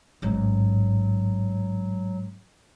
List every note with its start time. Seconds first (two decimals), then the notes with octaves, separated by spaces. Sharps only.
0.22 A1 G#2 F#3